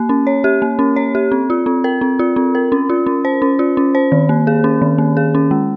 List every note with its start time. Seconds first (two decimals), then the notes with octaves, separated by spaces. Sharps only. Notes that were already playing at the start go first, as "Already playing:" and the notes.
Already playing: A#3
0.09 C#4
0.27 C#5
0.44 G4
0.62 A#3
0.79 C#4
0.96 C#5
1.15 G4
1.32 C4
1.50 F4
1.66 C4
1.84 A#4
2.01 C4
2.19 F4
2.36 C4
2.55 A#4
2.72 C#4
2.90 F4
3.07 C#4
3.25 C5
3.42 C#4
3.59 F4
3.77 C#4
3.95 C5
4.12 D#3
4.29 A#3
4.47 G#4
4.64 C#4
4.82 D#3
4.98 A#3
5.17 G#4
5.35 C#4
5.51 G#3